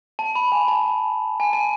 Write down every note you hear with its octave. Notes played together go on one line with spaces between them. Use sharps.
A5
B5
G#5
A5
G#5
A5